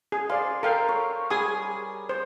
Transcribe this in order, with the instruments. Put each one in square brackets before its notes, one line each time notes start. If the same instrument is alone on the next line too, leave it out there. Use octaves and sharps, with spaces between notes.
[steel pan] G#4
[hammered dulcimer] C5 [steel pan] D5 F5
[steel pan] A4 F5 G5 [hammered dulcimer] A#4
[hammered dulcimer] C#5
[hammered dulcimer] G3 [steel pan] G#4 G#5 D#6
[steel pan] C5